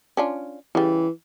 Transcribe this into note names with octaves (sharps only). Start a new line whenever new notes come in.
C#4 D4 F4
C#3 E3 G3